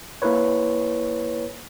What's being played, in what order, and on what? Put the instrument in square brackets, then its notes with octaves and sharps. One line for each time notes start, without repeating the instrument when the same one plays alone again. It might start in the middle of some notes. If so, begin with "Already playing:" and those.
[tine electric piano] A#3 E4 A#4 B4 C#5